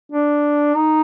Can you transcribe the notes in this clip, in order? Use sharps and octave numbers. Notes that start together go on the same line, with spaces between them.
D4
D#4